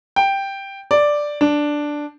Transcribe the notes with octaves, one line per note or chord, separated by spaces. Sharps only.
G5
D5
D4